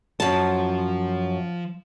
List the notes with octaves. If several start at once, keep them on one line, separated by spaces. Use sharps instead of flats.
F#2 F3 A5